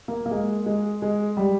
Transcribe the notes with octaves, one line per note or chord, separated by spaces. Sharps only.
A#3
A#3
G#3
G#3
G#3
G3